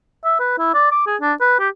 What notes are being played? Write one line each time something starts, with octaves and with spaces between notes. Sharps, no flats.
E5
B4
E4
D5
D6
G#4
D4
B4
G4